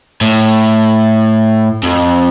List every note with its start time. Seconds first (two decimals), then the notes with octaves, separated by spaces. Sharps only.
0.21 A2
1.83 F2